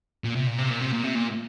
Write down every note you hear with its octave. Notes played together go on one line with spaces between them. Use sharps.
A#2
C3
A#2
C3
A#2
C3
A#2
C3
A#2